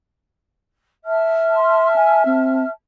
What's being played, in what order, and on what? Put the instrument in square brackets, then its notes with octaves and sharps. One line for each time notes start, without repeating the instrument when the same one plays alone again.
[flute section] E5 A5 F6
[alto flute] C6
G#5
C4